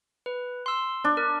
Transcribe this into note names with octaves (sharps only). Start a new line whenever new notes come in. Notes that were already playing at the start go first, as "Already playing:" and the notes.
B4
C6 E6
D4
A#4